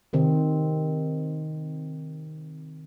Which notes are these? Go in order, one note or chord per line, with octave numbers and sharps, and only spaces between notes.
C3 D#3 C4